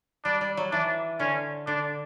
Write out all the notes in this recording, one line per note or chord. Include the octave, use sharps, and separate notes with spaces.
G3 D4
G3
F#3
E3 D4
D3 C#4
D3 D4